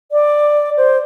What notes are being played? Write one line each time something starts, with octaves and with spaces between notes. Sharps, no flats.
D5
C5